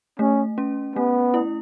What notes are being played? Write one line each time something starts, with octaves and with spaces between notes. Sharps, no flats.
A3 C#4
C#4
A3 B3
E4